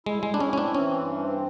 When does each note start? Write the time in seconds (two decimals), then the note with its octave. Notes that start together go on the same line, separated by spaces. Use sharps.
0.06 G#3 E4
0.23 G#3
0.29 E4
0.34 D4
0.40 C#4
0.51 C4 C#4
0.58 D4
0.74 E3 C#4
0.96 G2
1.19 C4